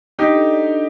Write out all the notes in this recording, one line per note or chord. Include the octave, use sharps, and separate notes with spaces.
D4 D#4 G4
A4
D5
D4